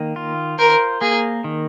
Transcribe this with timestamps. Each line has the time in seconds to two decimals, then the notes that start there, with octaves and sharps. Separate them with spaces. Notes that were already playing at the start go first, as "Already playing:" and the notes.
Already playing: D#3 A#3
0.16 F4
0.59 A#4 C5
1.01 A#3 G#4
1.44 D#3